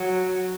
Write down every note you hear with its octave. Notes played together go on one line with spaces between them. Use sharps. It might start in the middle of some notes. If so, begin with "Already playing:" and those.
Already playing: F#3